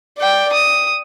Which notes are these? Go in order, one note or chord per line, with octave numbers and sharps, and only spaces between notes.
D5 G5
D#6